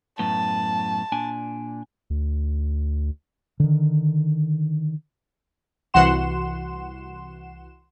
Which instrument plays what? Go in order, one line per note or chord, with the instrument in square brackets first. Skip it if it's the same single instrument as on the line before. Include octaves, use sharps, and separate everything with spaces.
[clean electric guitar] F#2 A2 B3 [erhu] A5
[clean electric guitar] A#2 D4 G#5
[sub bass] D2
[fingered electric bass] D3 D#3
[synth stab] C2 E3 F#4 F#5 C6 E7